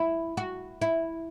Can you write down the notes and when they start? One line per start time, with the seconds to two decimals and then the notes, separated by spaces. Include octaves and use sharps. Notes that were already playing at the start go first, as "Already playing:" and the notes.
Already playing: E4
0.37 F#4
0.81 E4